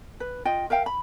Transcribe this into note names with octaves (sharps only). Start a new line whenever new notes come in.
B4
F4 D#5 G5
A#4 E5 F5 G5
B5